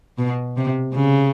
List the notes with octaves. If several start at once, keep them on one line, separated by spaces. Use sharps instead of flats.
B2
C3
C#3